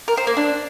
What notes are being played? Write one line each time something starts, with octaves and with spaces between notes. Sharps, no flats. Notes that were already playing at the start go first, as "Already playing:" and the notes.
A#4
C5
A#3
D4